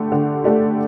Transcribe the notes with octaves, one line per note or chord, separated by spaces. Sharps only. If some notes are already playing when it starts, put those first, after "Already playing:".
Already playing: D3 A3 G4
D3
A3 D4 G4